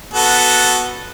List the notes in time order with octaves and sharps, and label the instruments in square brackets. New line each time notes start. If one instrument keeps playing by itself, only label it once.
[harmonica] B3 F#4 A4